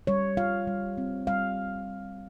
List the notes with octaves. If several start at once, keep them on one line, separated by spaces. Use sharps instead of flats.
G3 C#5
F4 F5
G3
C4
G3 F5